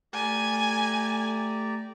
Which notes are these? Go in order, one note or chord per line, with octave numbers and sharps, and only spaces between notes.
A3 G4 D5 G#5 A#5